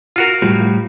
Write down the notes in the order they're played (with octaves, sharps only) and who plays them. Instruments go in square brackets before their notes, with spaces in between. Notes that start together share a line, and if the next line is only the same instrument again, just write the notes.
[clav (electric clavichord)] F4 F#4 A#4
[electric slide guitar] A2 F3 G3